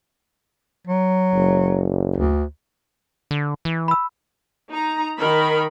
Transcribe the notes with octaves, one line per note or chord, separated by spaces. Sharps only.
F#3
F#1
D2
D3
E3
B5 E6
D#4 A#5
D#3 D#4 A#4 B5